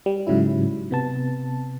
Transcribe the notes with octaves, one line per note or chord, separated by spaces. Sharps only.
G3
G#2 C#3 F#3 E4
C3 B3 A5